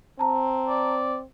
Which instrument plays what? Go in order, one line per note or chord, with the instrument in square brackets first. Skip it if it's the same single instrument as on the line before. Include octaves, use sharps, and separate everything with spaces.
[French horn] C4 [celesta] A5 A#5
[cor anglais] D5